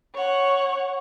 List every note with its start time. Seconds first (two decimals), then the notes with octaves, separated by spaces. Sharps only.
0.13 C#5 F#5